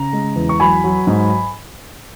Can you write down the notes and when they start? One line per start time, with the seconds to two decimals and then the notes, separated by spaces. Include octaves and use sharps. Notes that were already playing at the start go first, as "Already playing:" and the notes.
Already playing: C#3 A#5
0.13 G#3
0.36 E2
0.49 C#6
0.60 F#3 G#5 B5
0.84 F#3
1.07 G#2